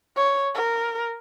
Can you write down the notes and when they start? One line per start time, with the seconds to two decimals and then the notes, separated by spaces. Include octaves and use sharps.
0.16 C#5
0.55 A#4